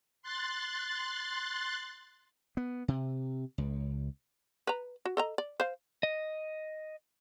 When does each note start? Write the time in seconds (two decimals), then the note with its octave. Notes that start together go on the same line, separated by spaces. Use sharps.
0.22 C6 F#6 A6
2.57 B3
2.88 C3
3.58 C#2
4.67 B4 A#5
5.05 F#4
5.17 A4 D#5 A#5
5.38 D5
5.60 C5 F5
6.03 D#5